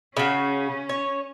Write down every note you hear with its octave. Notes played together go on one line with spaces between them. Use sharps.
C#3 C#4 F#4
C#5